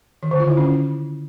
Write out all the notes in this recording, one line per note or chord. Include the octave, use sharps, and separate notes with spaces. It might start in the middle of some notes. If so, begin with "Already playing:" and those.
D#3
D3
F4
E4
C#4